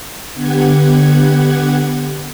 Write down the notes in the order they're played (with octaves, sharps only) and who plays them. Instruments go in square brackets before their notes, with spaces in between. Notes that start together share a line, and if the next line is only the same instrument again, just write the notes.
[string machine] D3 B3 G4 F#5 G#6